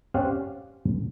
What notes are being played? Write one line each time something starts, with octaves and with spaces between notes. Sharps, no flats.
C4 C#4 G4 D5 F5 F#5